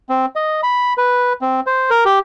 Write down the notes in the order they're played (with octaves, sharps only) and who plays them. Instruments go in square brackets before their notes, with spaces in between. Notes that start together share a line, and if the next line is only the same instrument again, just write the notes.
[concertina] C4
D#5
B5
B4
C4
C5
A#4
G4